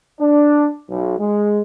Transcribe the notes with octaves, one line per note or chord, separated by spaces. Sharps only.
D4
B1
G#3